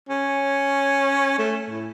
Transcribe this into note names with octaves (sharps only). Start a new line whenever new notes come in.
C#4
A3
A2